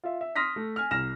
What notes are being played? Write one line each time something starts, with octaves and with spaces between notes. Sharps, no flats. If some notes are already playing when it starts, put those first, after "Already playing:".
F4 E5
E5
C6 D#6 F6 A#6 B6
A3
G#5 F6
C2 F6 A#6 E7